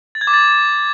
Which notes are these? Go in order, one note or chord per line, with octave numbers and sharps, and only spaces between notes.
A6
G#6
D6
A6